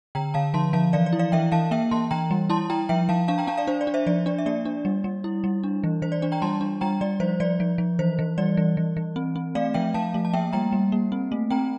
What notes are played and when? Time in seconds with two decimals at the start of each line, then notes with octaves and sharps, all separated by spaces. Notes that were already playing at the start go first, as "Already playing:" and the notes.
0.15 D3 G5 A#5
0.34 D3 F5 A5
0.54 F3 A5 C6
0.73 F3 F5 A5
0.93 E3 D5 F5
1.06 D5
1.13 E4
1.19 D5 F5
1.32 E3 E5 G5
1.52 E3 F5 A5
1.71 A#3 E5 G5
1.91 E3 A5 C6
2.11 E3 G5 A#5
2.31 G3
2.50 E4 A5 C6
2.70 E4 G5 A#5
2.89 F3 E5 G5
3.09 F3 F5 A5
3.28 D4 F5 A5
3.38 G5 A#5
3.47 D4 F5 A5
3.57 D5 F5
3.67 D4 C5
3.81 D5
3.87 D4
3.94 C5 E5
4.06 F3 D5
4.26 D4 D5
4.38 E5
4.46 A#3 D5
4.65 D4
4.85 G3
5.04 G3
5.24 E4
5.44 G3
5.63 D4
5.84 E3
6.02 E3 C5
6.12 D5
6.22 D4 D5
6.32 G5 A#5
6.42 G3 A5 C6
6.61 D4
6.81 G3 G5 A#5
7.01 G3 D5
7.20 F3 C5
7.40 F3 D5
7.60 F3
7.78 F3
7.99 E3 C5
8.19 E3
8.38 G3 D5
8.57 E3
8.77 E3
8.97 E3
9.16 C4
9.36 C4
9.55 A3 D5 F5
9.74 F3 E5 G5
9.94 F3 F5 A5
10.14 A3
10.25 A5
10.33 A#3 E5 G5
10.53 G3 G5 A#5
10.73 G3
10.92 A#3
11.12 C4
11.32 A3
11.50 C4 G5 A#5